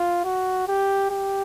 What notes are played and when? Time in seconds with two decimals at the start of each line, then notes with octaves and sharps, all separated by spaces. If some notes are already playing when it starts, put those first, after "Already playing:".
Already playing: F4
0.24 F#4
0.68 G4
1.10 G4